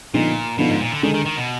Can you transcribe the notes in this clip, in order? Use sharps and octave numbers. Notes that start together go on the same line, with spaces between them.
A#2 D3 F3 B3 D#4
B2 D3 F3 B3 D#4
G#2
A#2
D3
D3 D#3 G#3 D4
D#3
D#3
B2